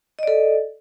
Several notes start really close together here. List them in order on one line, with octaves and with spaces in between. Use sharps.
D#5 D5 A4